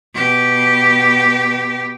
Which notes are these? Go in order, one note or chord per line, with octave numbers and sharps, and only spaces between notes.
B2 G4